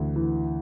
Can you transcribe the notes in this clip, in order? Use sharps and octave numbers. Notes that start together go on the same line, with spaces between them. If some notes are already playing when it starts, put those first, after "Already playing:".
Already playing: D2 E3
E3